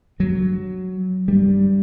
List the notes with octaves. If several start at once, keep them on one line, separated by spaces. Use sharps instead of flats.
G2 F#3
G2 G3